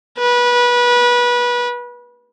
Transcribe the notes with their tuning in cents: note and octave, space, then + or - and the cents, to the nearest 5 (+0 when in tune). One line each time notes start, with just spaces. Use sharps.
B4 -25